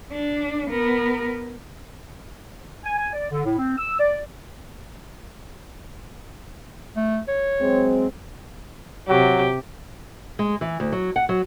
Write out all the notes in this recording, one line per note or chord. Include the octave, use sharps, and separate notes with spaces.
D4
B3 A#4
G#5
G#5
D5
D3
A2
C4
E6
D5
A3
C#5
F#3 G#3 C4
C3 F#3 G4
G#3
E3
D2
F#3
F#5
F#3